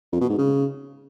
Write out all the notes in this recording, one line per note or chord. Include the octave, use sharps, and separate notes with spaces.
F2
B2
G#2
C#3